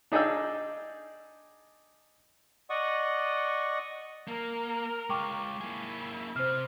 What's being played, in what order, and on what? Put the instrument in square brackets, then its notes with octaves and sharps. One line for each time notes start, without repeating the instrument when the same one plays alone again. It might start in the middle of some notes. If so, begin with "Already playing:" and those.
[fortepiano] D4 D#4 G#4 D5 G5 E6
[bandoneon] D5 D#5 F#5 C#6 D#6
[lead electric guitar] A#3 [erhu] A#4
[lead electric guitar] G#3 F4 [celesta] G5 C#6 D6
[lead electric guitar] A#3 G#4 [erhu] E4
[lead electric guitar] C3 [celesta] C5 F6